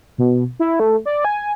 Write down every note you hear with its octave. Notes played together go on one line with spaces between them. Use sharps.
B2
E4
A3
D5
G#5